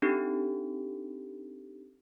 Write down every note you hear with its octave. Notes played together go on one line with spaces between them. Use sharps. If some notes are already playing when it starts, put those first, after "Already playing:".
C4 D4 D#4 G4 A4